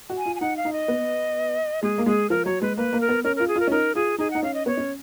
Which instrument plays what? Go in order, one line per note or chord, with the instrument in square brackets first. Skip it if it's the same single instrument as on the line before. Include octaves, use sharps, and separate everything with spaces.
[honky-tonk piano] F#4
[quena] G#5
[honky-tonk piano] F4
[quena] G#5
[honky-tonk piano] D#4 [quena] F#5
[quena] F5
[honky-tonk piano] D#4
[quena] D#5
[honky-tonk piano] B3
[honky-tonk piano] G#3 [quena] G#4
[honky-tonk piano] A#3
[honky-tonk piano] G#3 [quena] G#4
[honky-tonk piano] F3 [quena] A#4
[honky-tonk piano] F#3 [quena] C#5
[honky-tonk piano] G#3 [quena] B4
[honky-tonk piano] A#3 [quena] B4
[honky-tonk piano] A#3
[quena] A#4
[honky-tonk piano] B3
[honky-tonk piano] C#4 [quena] A#4
[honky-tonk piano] F4 [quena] A#4
[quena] G#4
[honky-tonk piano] F4 [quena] A#4
[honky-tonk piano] C#4
[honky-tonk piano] D#4 [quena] A#4
[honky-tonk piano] F4 [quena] G#4
[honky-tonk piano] D#4 [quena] G#4
[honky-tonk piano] D#4 [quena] F#5
[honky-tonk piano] C#4 [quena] F5
[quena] D#5
[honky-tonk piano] B3 [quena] C#5
[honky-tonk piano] C#4